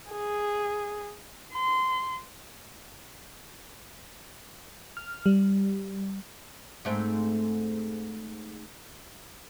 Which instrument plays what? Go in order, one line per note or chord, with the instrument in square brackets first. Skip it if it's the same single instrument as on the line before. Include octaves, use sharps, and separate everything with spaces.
[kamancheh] G#4
C6
[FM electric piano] F6
G3
[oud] G#2 A3 C4